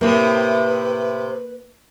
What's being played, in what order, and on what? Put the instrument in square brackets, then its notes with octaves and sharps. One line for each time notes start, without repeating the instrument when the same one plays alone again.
[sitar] A2 C3 [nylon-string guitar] A#3 [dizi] B4